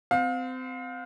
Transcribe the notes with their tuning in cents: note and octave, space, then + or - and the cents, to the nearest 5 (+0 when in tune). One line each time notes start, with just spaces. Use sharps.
C4 -25 F5 +30